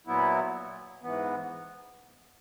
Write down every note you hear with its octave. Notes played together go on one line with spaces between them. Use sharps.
A#2 F#3 B3 E4
G#2 E3 B3